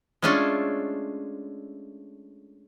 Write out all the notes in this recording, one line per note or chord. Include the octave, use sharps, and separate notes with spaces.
G#3 A3 C#4 D4 F4 A4